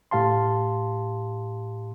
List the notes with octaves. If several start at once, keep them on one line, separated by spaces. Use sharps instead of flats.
A2 G4 F5 A5 C6